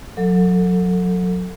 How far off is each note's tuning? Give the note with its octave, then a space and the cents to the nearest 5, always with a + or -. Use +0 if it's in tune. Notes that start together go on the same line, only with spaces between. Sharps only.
F#3 -30 A4 +20